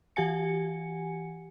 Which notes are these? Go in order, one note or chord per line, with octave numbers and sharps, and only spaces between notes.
E3 G4 F#5 G#5 C#7